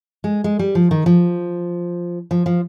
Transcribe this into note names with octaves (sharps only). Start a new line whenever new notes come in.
G#3
G#3
G3
F3
D#3
F3
F3
F3